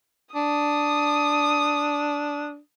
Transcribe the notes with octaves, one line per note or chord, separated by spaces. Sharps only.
D4 D#6